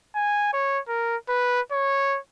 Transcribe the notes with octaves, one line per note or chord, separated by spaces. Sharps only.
G#5
C#5
A#4
B4
C#5